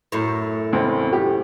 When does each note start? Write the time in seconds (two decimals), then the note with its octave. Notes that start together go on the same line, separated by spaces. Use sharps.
0.12 F#2 A2
0.72 E1 C#2 C4
1.13 G4